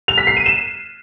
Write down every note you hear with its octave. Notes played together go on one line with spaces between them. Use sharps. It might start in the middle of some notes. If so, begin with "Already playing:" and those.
F7
B6
C7
D#7
E7